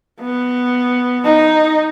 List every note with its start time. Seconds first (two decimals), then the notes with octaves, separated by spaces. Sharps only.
0.21 B3
1.24 D#4